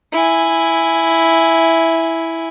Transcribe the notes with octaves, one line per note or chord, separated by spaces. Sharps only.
E4 G#5